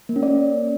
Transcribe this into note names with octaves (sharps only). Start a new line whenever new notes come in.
A#3
C#4
D5